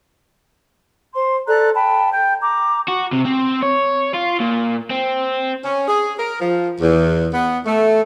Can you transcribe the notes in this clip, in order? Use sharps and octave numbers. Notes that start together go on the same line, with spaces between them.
C5 C6
A4 D5 A#5 F#6
G5 A5 B5
G5 G6
A#5 D6
F#4
C3
C4
C#5
F4
A#2
C4
C#4
G#4
A#4
F3
E2
B3
A3